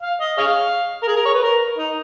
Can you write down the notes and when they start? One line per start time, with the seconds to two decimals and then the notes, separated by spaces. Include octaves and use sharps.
0.03 F5
0.21 D#5
0.38 G#4 C#5 F5
1.02 A#4
1.08 G#4
1.17 A#4
1.25 C#5
1.34 B4
1.43 A#4
1.78 D#4